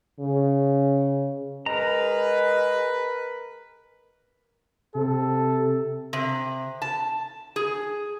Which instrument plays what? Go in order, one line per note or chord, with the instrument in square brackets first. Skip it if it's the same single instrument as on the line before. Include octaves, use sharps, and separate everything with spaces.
[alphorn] C#3
[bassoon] G#3 [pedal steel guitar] A#4 A#5 [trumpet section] B4
[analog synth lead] C3 [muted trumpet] A4
[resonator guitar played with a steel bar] C3
A5
G#4